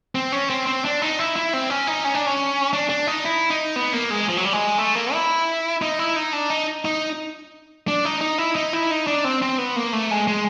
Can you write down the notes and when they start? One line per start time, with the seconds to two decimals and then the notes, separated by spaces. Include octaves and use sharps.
0.15 C4
0.32 C#4
0.50 C4
0.67 C4
0.85 D4
1.02 D#4
1.19 E4
1.36 E4
1.53 C4
1.70 C#4
1.87 D#4
2.05 C#4
2.15 D4
2.26 C#4
2.73 D4
2.89 D4
3.07 D#4
3.25 E4
3.50 D#4
3.76 B3
3.93 A#3
4.10 G#3
4.29 F3
4.37 F#3
4.45 G3
4.53 G#3
4.78 A3
4.95 A#3
5.13 E4
5.82 D#4
5.99 E4
6.16 D#4
6.33 D4
6.50 D#4
6.85 D#4
7.88 D4
8.05 D#4
8.21 D#4
8.38 E4
8.55 D#4
8.73 E4
8.91 D#4
9.07 D4
9.24 C4
9.42 C4
9.58 B3
9.76 A#3
9.93 A3
10.11 G#3
10.27 G#3